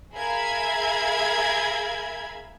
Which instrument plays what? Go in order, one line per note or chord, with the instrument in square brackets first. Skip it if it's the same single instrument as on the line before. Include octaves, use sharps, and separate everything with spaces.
[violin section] G#4 A#4 E5 F5 B5 G#6